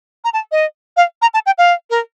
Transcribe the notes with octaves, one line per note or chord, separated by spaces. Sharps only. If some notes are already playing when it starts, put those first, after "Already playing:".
A#5
A5
D#5
F5
A#5
A5
G5
F5
A#4